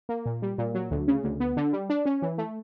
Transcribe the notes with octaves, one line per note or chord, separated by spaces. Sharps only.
A#3
A#2
G3
A#2
F#3
D2
C#3
D2
B3
D3
G3
D4
C#4
E3
A3